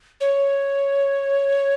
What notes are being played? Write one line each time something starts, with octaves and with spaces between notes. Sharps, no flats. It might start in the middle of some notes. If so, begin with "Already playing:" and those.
C#5